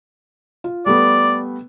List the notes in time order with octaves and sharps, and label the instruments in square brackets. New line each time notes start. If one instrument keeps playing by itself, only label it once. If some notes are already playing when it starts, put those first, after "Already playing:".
[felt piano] F4
[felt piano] G3 A3 B3 [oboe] D5